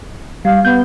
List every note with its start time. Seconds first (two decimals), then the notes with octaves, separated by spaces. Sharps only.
0.45 G3 F5
0.65 B3 G6